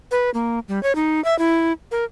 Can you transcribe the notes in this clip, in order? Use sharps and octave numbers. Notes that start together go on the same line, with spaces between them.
B4
A#3
G3
C#5
D#4
E5
E4
A#4